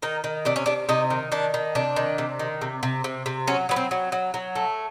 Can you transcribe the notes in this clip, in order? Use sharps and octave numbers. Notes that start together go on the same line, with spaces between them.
D#3 D#4
D#3
C3 D4
C#4
C3 D4
C3 D#4
D#3
D#3 D4
D#3
C3 D4
D#3
C3
D#3
C3
C3
C3
C3
F#3 C#4
F#3 B3
C4
F#3
F#3
F#3
A3